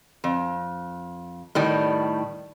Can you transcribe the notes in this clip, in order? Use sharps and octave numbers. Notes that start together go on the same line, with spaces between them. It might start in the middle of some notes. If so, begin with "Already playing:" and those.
F2
A2 D#3 G3